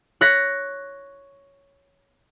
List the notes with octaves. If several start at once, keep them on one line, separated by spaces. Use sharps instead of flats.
C#5 F#6 A#6 B6 C#7